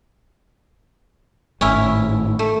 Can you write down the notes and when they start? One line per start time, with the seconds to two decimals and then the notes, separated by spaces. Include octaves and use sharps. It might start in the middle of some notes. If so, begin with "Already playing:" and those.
1.61 G#1 A2 C#4 E4
2.39 A3